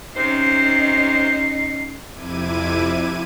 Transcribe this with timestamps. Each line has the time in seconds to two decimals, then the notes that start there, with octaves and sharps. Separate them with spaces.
0.16 C3 C#4 D#4 C5 C7
2.11 F2 C3 E4 D6 G#6 D#7